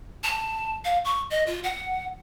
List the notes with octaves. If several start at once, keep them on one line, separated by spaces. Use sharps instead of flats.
A5
F5
C#6
D#5
F4
F#5